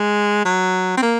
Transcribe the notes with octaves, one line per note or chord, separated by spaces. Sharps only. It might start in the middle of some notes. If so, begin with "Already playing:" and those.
Already playing: G#3
F#3
C4
A#3